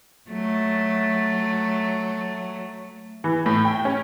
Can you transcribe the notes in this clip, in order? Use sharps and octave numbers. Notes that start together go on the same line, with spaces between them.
F#3 A3
E3
A2
G5
C#4